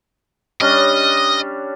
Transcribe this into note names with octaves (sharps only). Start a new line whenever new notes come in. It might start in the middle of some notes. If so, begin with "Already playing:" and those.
G3 C#4 D4 D#5